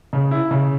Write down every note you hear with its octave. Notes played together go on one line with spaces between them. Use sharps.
C#3
E4
C#3